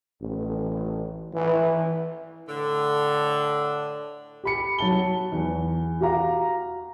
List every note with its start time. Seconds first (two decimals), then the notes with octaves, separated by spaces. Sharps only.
0.22 A1
1.34 E3
2.48 A2 D3
4.44 G4 B5 C#7
4.78 F#3 A5 G7
5.32 E2
6.01 F#4 G4 F5 A#5